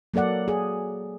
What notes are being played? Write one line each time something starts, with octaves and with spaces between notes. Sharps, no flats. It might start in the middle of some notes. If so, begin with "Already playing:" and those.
F#3 A#3 A4 D5 F#5
G#4